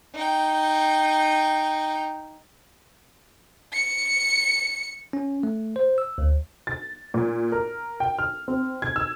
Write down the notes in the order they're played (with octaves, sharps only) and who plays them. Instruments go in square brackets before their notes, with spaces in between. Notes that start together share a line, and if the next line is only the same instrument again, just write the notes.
[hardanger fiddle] D#4 G5
[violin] C#7
[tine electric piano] C#4
A3
C5
E6
D2
[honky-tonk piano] A6
A#2
A#4
G5
F6
C4
G#6
E6